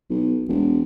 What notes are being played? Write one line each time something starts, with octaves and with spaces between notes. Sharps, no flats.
B1
E1